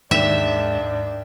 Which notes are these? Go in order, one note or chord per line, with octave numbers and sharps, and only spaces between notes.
D#2 G#2 D4 E5 E7